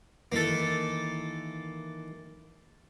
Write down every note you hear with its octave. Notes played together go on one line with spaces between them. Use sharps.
D#3 E3 A#3 E4 A4